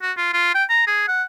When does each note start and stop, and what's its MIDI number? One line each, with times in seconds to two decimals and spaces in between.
0.02 0.12 66
0.17 0.33 65
0.33 0.53 65
0.54 0.64 79
0.69 0.82 82
0.87 1.08 68
1.08 1.23 78